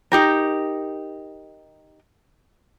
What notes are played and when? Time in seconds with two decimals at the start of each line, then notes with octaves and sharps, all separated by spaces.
0.12 D#4 G4 A#4